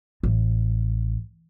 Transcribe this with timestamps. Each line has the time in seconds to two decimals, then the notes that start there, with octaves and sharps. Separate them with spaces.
0.23 A1